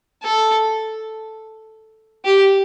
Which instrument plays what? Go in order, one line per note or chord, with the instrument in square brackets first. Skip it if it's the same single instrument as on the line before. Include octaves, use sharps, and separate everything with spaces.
[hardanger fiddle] A4
G4